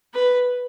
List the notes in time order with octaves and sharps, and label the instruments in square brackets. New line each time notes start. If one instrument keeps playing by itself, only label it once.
[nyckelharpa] B4